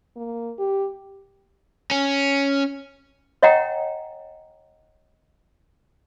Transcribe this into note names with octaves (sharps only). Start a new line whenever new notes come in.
A#3
G4
C#4
C#5 D#5 F#5 G5 A#5